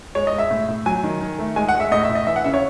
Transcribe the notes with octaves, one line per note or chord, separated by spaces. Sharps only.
G#3 C#5
D#5
G#3
E5
A2
A2
F#3 G#5
D#3
D#3
A3
G#3 G#5
F#5
G#3
E5
A2 D#5
E5
A2
D#5
E3 E5
F#5
C#3 E5
C#5